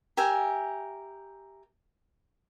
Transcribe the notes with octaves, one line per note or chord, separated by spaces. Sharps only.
G4 A#4 E5 G#5